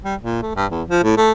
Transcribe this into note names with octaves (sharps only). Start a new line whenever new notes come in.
G3
A#2
A3
G2
E2
F3
A2
A3